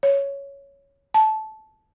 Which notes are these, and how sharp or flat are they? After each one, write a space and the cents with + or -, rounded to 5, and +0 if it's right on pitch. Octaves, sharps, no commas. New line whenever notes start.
C#5 +5
A5 -15